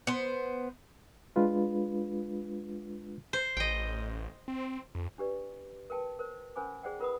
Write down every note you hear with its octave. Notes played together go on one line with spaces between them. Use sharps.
B3 C5
G#3 D4 F4 B4
C5
A1 D#5 G5
C4
F2
D4 G4 B4 D5
A#4 B4 G5 A5
A#4 C5
C#4 A#4 C5 G#5 B5 D6
G#4 C5 D5 F#5 G5
F4 A#4 B4 F#5 B5 D#6